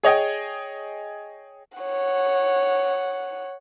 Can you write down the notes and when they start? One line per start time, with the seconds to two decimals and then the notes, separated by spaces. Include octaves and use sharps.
0.03 G#4 C#5 D#5 G5
1.78 C#5 F#5